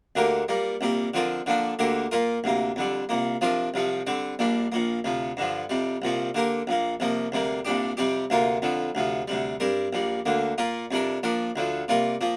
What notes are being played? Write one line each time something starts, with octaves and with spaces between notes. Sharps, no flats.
D2 D3 A#3 G4 A#4
A#2 G3 A#3
C2 A#2 A#3 G4
D3 F3 C4 F4 A#4
D3 F3 A#3 D4
D2 D3 A#3 G4 A#4
A#2 A#3 F4 A#4
D2 C3 A#3
F2 D3 G3
C2 A#2 A#3
C3 F3 D4 F4 A#4
C2 C3 F3 C4
D3 G3 C4
A#1 A#2 G3 D4
A#1 A#2 A#3
D2 C3 F3
G2 D3 F3
F2 C3 G3
C2 A#2 F3 C4
D3 A#3 G4 A#4
A#1 A#2 A#3
C2 C3 F3 A#3
D2 C3 G3 A#3
C2 A#2 G3 D4 G4
F2 C3 G3 C4 G4
D2 C3 A#3 F4 A#4
F2 D3 F3
D2 C3 F3
D2 C3 G3
G2 G3 C4 A#4
A#1 A#2 G3
D2 D3 A#3
A#2 A#3 F4 A#4
F2 C3 G3 D4 A#4
A#2 F3 D4 A#4
D2 D3 F3
C3 G3 A#3 F4 A#4
A#2 F3 A#3